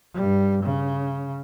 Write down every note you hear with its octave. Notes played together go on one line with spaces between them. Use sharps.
G2 G3
C#3